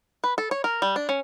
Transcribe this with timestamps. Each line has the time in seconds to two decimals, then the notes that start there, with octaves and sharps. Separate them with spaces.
0.24 B4
0.38 A4
0.51 C#5
0.64 A#4
0.82 G3
0.96 D4
1.09 C#4